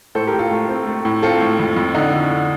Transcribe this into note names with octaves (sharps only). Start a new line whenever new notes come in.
A2 A4 C5
G4 A#4
A2
F4 A4
A3
C4
A3
A2
C4 F4 A4
A2
F2
F2
D3 D#4
D3
D3